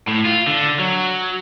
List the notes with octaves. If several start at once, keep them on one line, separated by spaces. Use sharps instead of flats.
A2
F4
D3
F#3